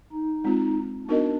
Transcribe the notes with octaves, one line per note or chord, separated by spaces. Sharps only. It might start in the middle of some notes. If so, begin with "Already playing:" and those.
D#4
G#3 C4 F4
B3 D4 D#4 F#4 A#4 D#5